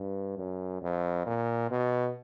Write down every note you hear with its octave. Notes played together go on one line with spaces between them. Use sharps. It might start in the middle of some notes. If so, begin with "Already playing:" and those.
Already playing: G2
F#2
F2
A#2
B2